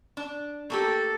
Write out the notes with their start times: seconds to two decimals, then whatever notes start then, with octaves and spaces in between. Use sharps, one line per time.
0.17 D4
0.70 A3 A#3 G4 A4